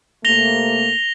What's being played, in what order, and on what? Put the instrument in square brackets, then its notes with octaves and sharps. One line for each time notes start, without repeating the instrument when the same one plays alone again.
[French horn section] C3 A3 A#3 [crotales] A#6 F7 G7